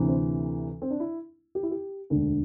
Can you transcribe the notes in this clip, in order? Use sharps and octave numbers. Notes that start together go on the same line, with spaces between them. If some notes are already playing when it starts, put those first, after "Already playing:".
Already playing: D2 C3 E3
C4
C4
D4
E4
G4
E4
G4
E1 D2 D3